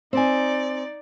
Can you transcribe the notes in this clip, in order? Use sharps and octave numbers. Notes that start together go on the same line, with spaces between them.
C4 D#4 D5 G#5